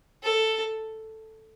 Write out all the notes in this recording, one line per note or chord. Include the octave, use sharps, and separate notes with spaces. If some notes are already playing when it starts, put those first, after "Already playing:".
A4